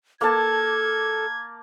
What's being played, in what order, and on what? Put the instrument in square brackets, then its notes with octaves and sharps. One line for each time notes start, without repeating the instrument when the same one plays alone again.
[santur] A#3 A5 [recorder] A4 [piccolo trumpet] G#6